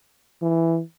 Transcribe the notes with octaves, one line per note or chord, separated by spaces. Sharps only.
E3